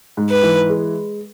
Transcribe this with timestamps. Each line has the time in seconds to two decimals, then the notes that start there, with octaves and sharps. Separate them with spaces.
0.17 G#2
0.30 B4
0.43 E3
0.69 G#3